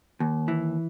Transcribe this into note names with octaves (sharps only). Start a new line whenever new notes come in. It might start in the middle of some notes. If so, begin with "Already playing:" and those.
D#2
E3